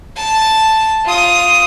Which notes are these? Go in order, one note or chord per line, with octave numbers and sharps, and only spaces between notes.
A5
F4 D#6